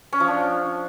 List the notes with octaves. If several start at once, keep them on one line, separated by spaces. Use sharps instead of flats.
C#4
F3
D4